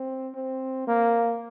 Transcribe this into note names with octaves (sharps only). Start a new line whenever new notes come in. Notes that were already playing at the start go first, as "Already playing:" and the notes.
Already playing: C4
C4
A#3